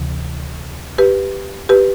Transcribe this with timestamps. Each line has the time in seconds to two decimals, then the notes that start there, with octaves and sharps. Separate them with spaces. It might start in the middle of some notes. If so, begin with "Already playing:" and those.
Already playing: D2 C3 E3
0.98 G4 B4
1.69 G4 B4